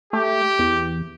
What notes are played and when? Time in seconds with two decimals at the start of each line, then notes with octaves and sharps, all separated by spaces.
0.13 A3 G4
0.59 E2